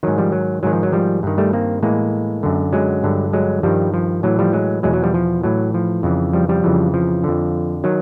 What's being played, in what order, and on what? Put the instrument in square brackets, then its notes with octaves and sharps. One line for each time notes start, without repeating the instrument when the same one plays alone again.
[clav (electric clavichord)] G#2 D#3 F#3
F3 G3
F#3
G#2 D#3 F#3
F3
F#3
F3 G3
G2 D#3
G3 A3
A#3 C4
A2 E3 G#3 A#3
F#2 D3
F#3 G#3
G2 D3
F#3 G#3
G2 D#3 F3 G3
F3
A2 E3 F#3
F3 G3
F#3 G#3
E2 B2 F#3 G#3
F#3
F3 G3
F3
A2 E3 F#3
F3
F2 C#3 E3
F3 G3
F3 G3
F2 C#3 E3
F3
F2 D3
D#3 F#3